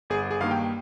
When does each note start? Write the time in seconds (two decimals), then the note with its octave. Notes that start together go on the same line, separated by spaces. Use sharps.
0.10 G1 G#4
0.31 G#4
0.40 G2 D#3 A#3 F5
0.51 G5